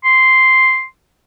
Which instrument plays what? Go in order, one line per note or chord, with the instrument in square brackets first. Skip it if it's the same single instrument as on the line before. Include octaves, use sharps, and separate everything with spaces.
[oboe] C6